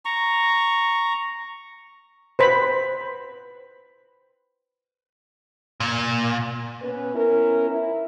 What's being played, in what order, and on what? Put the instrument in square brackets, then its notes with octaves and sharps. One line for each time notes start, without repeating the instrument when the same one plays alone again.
[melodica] A#5 C#6
[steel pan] B4 C5 B5
[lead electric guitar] A#2
[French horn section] B3 C#4 B4
B3 C#4 E4 A#4
E4